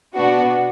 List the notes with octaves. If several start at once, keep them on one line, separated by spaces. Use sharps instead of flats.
B2 B3 D4 F#4